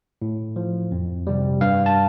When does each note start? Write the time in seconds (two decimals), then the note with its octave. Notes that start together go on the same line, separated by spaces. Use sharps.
0.22 A2
0.56 F3
0.92 F2
1.27 C3 G3
1.61 G2 F5
1.86 A5